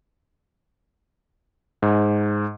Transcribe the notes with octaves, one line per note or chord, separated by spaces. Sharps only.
G#2